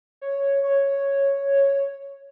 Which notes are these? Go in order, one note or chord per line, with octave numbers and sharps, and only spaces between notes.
C#5
C#5